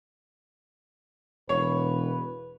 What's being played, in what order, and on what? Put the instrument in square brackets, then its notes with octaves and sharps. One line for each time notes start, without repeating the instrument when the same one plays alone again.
[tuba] E1 [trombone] B4 [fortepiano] C#5